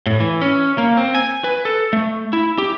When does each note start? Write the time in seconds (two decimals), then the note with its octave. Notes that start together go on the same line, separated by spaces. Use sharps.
0.06 A2
0.20 E3
0.41 C#4
0.78 A#3
0.97 C4
1.15 G#5
1.44 B4
1.65 A4
1.93 A3
2.33 E4
2.58 G4